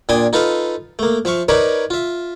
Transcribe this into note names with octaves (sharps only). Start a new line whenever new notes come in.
A#2 D4 G5 G#5 C6 D#6
D#4 F4 A4 B4 F5
A3 A#3
F3 E5 F5 C#6
D#4 A#4 B4 C#5 D5 B5
F4 E5